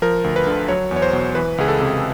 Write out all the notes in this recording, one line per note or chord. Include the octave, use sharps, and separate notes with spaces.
F3 A#4
D2
B4
D3
F#3 C#5
E2
C#5
C5
B2
E3 B4
C#2 G#4
A4
C3